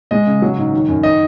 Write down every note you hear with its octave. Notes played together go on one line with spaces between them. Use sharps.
G#3 D#5
C#3
F#3
G#2
D#3
F#2
D#3 D#5